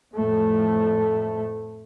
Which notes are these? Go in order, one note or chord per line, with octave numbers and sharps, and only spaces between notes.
F2 A2 A3